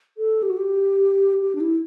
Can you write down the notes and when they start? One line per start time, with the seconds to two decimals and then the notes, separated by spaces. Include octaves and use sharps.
0.18 A4
0.43 G4
0.50 F#4
0.57 G4
1.42 G4
1.55 D4
1.60 E4